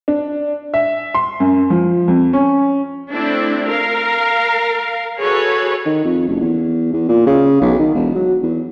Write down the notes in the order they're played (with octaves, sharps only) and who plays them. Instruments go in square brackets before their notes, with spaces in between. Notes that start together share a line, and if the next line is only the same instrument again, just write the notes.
[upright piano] D4
E5
C6
F#2
F3
F2
C#4
[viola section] A3 C4 D4 E4
A#4 F5
F#4 G#4 A4 B4 C#5
[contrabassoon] D#3
F2
F#1
E2
E2
A#2
C#3
B1
D#3
E1
F#3
E2